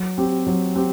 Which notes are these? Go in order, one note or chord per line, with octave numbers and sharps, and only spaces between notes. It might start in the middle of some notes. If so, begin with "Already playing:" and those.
Already playing: F#3
C4 G4
F#3
C4 G4